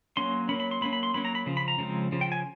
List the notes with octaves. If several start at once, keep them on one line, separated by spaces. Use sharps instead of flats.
F#3 A#3 C#4 C6
F#3 A#3 C#4 B5
B5
C6
F#3 A#3 C#4 B5
B5
C6
F#3 A#3 C#4 B5
A#5
B5
C#3 F3
B5
A#5
C#3 F3 G#3 C4
C#3 F3
G5
G#5